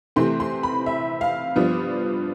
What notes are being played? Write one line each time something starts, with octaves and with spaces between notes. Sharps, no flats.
C3 E3 A3 C4 C6
C6
B5
E5
F5
G2 F3 B3 D4